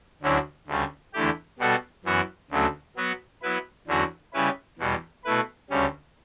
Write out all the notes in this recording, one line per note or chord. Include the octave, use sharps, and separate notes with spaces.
D2 D3 F#3 C#4 E4
D2 C#3 G3 C#4
E2 D3 A3 E4 G4
B2 G3 B3 F#4 A4
F#2 E3 B3 F#4
D2 C#3 F#3 A3
F#3 B3 F#4 B4
F#3 B3 E4 B4
E2 D3 F#3 C#4 F#4
C#3 G3 C#4 E4 B4
E2 B2 G3
B2 A3 E4 B4
D2 C#3 G3 C#4